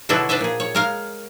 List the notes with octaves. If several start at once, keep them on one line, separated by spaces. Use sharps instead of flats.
B2 D3 F#3 D4 E4 F#4
D4 B4 C5 D#5 E5
A#2 G#4
C#5
G#3 A#4 F5